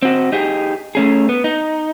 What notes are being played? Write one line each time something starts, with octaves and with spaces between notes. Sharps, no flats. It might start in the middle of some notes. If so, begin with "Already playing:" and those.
C4 F#4
D#4 G4 G#4
A3 C#4 G#4
B3
D#4